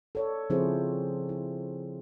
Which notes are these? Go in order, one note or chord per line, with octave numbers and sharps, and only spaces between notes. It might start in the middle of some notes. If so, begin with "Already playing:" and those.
A4 C#5 D5
C#3 F3 C4 E4 G#4 C5
E4